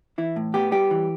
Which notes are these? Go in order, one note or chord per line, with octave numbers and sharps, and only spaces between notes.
E3 E4
A2
B3 G4
G3 G4
E3